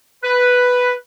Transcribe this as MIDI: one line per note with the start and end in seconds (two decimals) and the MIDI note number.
0.24 0.92 71